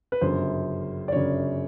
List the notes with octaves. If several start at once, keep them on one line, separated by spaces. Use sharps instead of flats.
B4
G1 F#2 C#3 C5
D5
G1 F#2 C#3 C#5